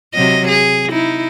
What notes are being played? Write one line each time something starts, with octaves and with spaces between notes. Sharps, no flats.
C3 F#3 D#5
G#4
D#4 E4